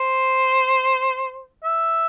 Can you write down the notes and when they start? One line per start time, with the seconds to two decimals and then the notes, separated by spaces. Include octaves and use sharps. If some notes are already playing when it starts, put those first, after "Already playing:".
Already playing: C5
1.64 E5